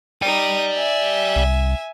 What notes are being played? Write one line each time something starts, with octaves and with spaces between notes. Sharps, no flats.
D#4 D5 G5 D#7
E5 G#5
C2